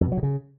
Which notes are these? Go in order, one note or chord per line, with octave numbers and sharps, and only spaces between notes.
F2
B2
F#3
B2
C#3